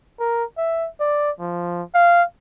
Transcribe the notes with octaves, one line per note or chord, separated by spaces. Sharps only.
A#4
E5
D5
F3
F5